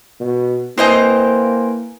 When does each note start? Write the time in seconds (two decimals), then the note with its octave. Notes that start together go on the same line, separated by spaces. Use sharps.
0.20 B2
0.78 A#3 C4 E4 B4 C5 D#5 G#5